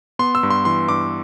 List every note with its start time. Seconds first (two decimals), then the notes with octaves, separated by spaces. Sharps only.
0.19 B3 C6
0.35 E6
0.43 G2
0.50 C6
0.65 E3 C6
0.89 G2 D6